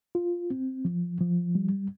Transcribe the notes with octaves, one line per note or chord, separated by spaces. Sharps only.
F4
C4
F3
F3
G3